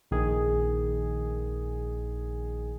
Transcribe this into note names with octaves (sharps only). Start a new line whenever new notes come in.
A#1 D#3 G#4